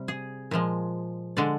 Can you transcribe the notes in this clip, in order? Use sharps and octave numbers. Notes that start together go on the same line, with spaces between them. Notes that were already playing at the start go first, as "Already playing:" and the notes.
Already playing: C3 G3
G#4
A#2 F3 G#3
D3 G#3 D5